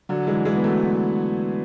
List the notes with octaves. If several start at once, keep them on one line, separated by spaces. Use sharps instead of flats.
D3 F#3
E3 G#3
E3 G#3
B3
F#3 A3